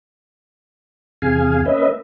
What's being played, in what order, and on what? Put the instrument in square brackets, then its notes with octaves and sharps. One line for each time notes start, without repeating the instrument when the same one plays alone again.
[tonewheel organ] E2 C3 G#4 F5 G#5
A#3 C#4 B4 D#5 E5